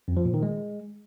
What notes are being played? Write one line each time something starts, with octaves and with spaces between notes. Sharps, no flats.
F2
F3
A#2
D#3
G#3